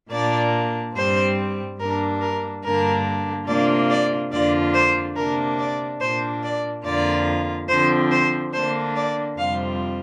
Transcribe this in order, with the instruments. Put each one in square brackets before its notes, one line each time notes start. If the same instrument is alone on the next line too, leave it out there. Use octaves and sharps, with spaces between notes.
[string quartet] A#2 A#3 D4 D5
G2 G3 C4 C5
G2 G3 A#3 D4 A#4
A#4
G2 D3 A#3 D4 A#4
C3 A#3 D4 F4 D5
D5
F2 D3 A#3 D4 F4 D5
C5
C3 A#3 D4 A#4
D5
A#2 A#3 D4 C5
D5
F2 D3 A#3 F4 D5
D3 F3 C4 C5
C5
D3 A#3 D4 C5
D5
F2 C3 G3 C4 F4 F5